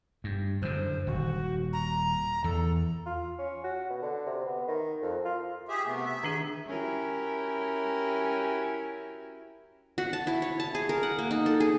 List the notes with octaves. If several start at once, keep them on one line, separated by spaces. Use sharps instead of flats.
G2
F#2 D3 C5
D#1 F#4
A#5
E2 A4
F4
C#4
F#4
B2
D3
C3
B3
D#3
F2
F4
G4 G#4 E5
C3 A3 B3
E5
D#3 D4 G#4
C#4 E4 F#4 G4 A#4
F#4
A5
E4
C#5
A5
G#4
A#4
F#5
A#3
D#4
A4
G#4